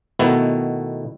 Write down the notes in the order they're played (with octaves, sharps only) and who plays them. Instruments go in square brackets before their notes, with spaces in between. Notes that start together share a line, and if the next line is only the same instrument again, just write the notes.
[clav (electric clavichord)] B2 D#3 A3 B3 E4